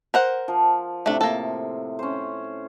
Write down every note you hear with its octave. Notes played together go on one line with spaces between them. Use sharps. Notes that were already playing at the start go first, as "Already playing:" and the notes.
A#4 C5 F#5
F3
A2 C3 A3 D4
A#3 A4
C#4 C5